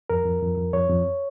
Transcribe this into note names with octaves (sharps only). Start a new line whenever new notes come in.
F2 A#4
F2
F2
F2
F2 C#5
F2